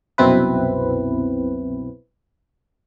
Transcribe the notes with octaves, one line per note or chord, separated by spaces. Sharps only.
C2 F#2 B2 C4 E4 B4